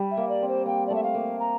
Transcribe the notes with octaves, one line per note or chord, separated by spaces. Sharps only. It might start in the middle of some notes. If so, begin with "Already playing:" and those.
Already playing: G3
E5
A#3
D5
C4
C5
A#3 G5
D5
A3 E5
F5
A#3
A#5